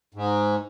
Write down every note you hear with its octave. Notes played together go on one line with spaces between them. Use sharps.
G#2